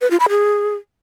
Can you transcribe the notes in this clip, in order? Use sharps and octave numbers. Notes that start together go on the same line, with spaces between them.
B4
F4
B5
G#4